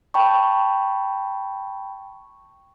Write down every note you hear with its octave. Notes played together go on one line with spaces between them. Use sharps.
G5 A5 B5 C#6